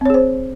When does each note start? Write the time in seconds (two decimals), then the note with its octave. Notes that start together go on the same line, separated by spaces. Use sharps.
0.01 C4
0.06 C#5
0.10 G#4
0.14 C5